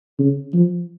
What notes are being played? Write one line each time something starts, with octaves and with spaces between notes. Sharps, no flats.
C#3
F3